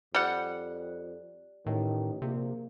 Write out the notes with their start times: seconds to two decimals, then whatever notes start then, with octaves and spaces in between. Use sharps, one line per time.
0.15 F2 G3 F#5
1.66 A1 A2 D#3
2.22 A#1 C3 A#3